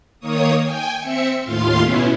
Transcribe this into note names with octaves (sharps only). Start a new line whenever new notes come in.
D#3 A#3 C#5 D#6
G5 G#5
C4 E5 C#7
D#2 A2 F4 F5 C6
B2 B3 C#4 E4